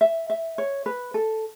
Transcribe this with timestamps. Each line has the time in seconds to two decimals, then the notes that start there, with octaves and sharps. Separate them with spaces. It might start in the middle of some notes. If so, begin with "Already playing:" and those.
0.01 E5
0.30 E5
0.58 C#5
0.86 B4
1.14 A4